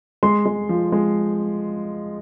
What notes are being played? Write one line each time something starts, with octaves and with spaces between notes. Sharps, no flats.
G#3 C6
G#3
F3
G#3